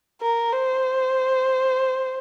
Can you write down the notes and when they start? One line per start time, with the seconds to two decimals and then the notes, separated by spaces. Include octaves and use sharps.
0.21 A#4
0.52 C5